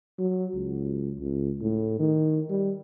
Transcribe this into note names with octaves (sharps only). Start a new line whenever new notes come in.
F#3
C#2
C#2
A2
D#3
G3